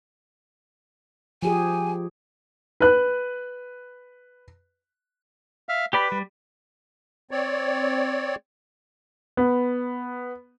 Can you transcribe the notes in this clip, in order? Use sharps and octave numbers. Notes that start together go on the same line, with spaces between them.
F3 G4 G#4 G#5
B4 F#6
E5 F5
G4 B4 D5 B5
G3
C4 C#5 D5
B3